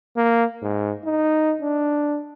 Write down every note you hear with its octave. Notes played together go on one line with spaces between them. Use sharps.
A#3
G#2
D#4
D4